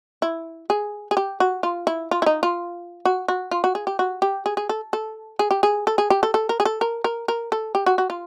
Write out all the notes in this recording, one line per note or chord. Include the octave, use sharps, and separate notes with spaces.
E4
G#4
G#4
G4
F#4
F4
E4
F4
E4
D#4
F4
F#4
F#4
F4
F#4
G#4
G4
F#4
G4
G#4
G#4
A4
A4
G#4
G4
G#4
A4
G#4
G4
A4
A4
A#4
G#4
A4
A#4
A#4
A#4
A4
G4
F#4
F#4
F4